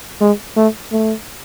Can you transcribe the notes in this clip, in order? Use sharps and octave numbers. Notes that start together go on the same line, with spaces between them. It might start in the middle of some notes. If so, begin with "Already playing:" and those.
G#3
A3
A3